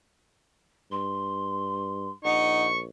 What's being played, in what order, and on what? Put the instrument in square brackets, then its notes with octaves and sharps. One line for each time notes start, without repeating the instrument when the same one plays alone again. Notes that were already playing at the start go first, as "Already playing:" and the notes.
[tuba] G2 [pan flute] C6
[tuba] A#1 [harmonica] D#4 [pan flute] F#5 [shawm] C#6